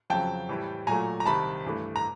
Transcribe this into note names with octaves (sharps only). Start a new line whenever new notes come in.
F2 C#3 F#3 G5 A5
A2 E3 G3
A#2 F#3 A3 G#5 A#5
A#5
C2 C3 D#3 A5 B5
G2 E3 A3
A#5